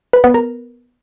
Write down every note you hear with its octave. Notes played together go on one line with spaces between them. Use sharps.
B4
B3
A#4